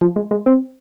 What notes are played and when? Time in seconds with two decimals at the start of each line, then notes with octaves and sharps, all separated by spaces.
0.01 F3
0.16 G#3
0.31 G#3
0.46 C4